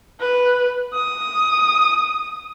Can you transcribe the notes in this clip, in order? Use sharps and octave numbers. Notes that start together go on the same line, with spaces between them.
B4
D#6